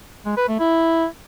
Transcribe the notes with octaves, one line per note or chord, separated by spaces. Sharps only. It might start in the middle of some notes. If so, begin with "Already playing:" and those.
G#3
B4
A3
E4